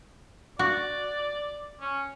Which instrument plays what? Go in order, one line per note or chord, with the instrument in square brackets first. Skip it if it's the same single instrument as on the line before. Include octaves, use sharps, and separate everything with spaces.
[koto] F#4 [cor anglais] D5
[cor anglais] C#4